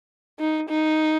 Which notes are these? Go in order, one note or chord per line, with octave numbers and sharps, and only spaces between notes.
D#4
D#4